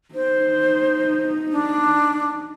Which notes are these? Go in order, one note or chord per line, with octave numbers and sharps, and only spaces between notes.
D#4 C5
D4